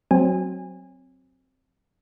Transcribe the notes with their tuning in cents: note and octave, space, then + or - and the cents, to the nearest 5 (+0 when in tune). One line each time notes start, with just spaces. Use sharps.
F#3 +0 C4 +0 G#5 -25